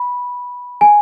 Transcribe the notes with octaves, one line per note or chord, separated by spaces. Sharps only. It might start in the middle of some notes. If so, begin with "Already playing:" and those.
Already playing: B5
G#5